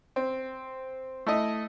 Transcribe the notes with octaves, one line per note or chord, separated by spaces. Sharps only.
C4
A3 E4 D#5